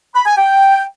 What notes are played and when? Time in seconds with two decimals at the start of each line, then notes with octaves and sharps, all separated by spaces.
0.15 B5
0.26 G#5
0.37 G5